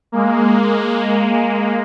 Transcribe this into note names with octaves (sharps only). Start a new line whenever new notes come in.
G#3 A#3